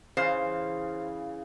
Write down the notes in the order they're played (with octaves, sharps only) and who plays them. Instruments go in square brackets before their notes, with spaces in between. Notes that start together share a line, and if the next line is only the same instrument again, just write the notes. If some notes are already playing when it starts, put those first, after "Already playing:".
[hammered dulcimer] C#3 E3 F5 [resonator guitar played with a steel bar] C5